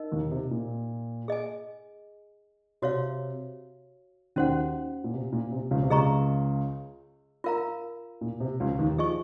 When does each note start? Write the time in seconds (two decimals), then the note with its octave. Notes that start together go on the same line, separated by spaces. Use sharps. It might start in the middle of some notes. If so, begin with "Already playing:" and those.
Already playing: D#4 A#4 D#5
0.12 D#2 D#3
0.31 C3
0.51 A#2
1.28 G#4 D#5 G#5
2.82 C3 F#4 C#5 F5
4.36 D#2 D#3 C#4 F#4 C5 F#5
5.04 A#2
5.13 C3
5.32 A#2
5.52 C3
5.71 C#2 C#3
5.83 C3
5.90 C#2 C#3 G#4 D#5 A#5 C#6
7.44 F4 A#4 F5 A#5
8.21 A#2
8.40 C3
8.60 C#2 C#3
8.79 D#2 D#3
8.98 F3 G#4 D#5 G#5 C#6